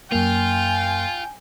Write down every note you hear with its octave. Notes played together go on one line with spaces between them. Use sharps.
F#2 A#3 F4 G5 G#5